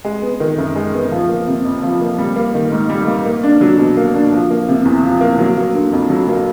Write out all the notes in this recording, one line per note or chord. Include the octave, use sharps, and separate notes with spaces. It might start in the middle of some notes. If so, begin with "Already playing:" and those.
G#3
B3
D#3
F#2
G#3
B3
F3
A#3
C3
F2
F3
A#3
G3
A#3
D#3
G#2
G3
A#3
A#3
D4
F#3
B2
A#3
D4
F3
A#3
C3
E2
F3
A#3
F#3
A#3
D3
F2
F#3
A#3